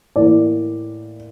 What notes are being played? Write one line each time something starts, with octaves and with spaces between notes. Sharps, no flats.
A2 E3 A#3 D5